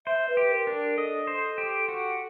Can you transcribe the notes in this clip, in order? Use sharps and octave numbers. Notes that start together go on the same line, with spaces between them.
C5 E5
B4
G4
A#4
D4
A#4
A4 D#5
C5
G4
F#4